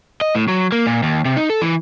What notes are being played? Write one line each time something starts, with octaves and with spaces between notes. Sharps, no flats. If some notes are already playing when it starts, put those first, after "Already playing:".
D#5
A2
F#3
A#3
A#2
D#2
C3
D#4
A4
E3